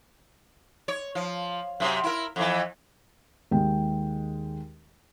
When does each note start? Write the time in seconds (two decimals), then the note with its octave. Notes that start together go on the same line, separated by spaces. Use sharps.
0.88 C#5
1.15 F3
1.80 F#2 C3
2.04 E4 A#4
2.36 F2 E3
3.51 D#2 G#3 G5